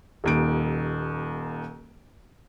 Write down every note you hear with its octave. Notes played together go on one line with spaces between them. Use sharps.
D#1 D#2 D7